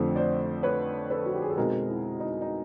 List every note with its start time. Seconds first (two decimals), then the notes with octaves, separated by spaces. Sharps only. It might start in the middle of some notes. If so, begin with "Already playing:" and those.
Already playing: F2 D3 F3 A3 C4
0.16 C5 D5
0.63 B4 C#5
1.10 A4 B4
1.26 F#4
1.34 G4
1.42 G#4
1.50 A4
1.57 B2 G#3 C4 D#4 G#4 A#4
1.88 E4
2.20 D#4
2.42 D#4